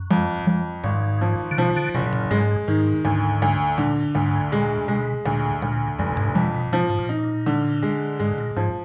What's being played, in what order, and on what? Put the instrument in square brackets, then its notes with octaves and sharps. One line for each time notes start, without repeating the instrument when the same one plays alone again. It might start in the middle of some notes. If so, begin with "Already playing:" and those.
Already playing: [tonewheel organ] F#2
[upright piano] F2
F2
[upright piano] G#1 [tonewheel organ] G#2
[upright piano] F3
[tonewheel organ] D3
[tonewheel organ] B2 [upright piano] F3
[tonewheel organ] D3
[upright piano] F#1 [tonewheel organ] B2
[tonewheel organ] B2
A#2
[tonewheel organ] G#2 [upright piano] G#3
[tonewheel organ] G#2 [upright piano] D#3
[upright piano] D2 [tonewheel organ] G#2
[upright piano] D2
[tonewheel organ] A#2 [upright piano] D3
[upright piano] D2 [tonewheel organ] G#2
[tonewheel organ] A#2 [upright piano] G#3
[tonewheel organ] B2 [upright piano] G#3
[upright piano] D2 [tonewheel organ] A#2
[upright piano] D2 [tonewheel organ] A#2
[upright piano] F1 [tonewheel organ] F#2
[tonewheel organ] G#2
[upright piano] F2 [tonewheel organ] B2
[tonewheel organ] B2
[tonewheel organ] B2 [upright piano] F3
[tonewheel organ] A#2
G#2
A#2
[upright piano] D#4
D3
G#3
[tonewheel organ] G#2 [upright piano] G#3
[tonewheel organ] A#2
[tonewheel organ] G#2 [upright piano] F3